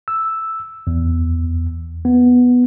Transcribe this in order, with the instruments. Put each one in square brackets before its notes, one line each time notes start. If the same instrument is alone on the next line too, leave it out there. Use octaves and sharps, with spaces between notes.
[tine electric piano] E6
E2
B3